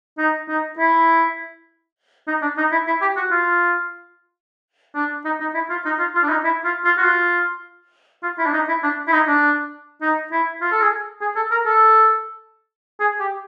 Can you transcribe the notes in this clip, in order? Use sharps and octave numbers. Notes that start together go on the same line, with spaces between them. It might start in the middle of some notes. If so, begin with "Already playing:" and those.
D#4
D#4
E4
D#4
D4
D#4
E4
E4
G4
F#4
F4
D4
D#4
D#4
E4
F4
D#4
F4
F4
D4
D#4
E4
F4
F4
F#4
F4
F4
E4
D4
D#4
E4
D4
E4
D#4
D4
D#4
E4
F4
A4
G#4
G#4
A4
A#4
A4
G#4
G4